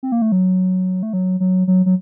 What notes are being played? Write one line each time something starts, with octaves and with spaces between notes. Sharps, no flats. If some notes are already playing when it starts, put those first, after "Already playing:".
C4
A#3
A3
F#3
A3
F#3
F#3
F#3
F#3